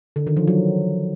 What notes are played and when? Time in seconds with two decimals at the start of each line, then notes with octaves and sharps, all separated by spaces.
0.16 D3
0.27 D#3
0.37 F3
0.48 F#3